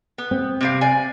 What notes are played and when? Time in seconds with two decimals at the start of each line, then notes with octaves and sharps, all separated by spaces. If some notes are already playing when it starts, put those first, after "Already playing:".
0.18 B3
0.31 C4
0.61 C3 G3 F5
0.81 D5 G#5